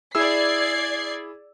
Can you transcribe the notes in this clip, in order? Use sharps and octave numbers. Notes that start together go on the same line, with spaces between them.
E4 G#4 D5 E6 G#6 C7